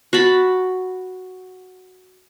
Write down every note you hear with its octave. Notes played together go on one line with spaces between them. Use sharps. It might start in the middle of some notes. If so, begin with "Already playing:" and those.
F#4 A5 B5